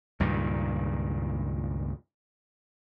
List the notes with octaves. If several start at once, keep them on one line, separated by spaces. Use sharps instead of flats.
C#2 G2 A#2 D#3